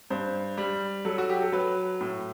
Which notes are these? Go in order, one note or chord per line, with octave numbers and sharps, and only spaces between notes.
G2 C5
G3
F#3 A4
F#4
G4
A4
F#3 B4
A2